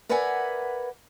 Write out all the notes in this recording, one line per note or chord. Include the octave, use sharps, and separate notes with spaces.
A#4 B4 D5 E5 F#5 G#5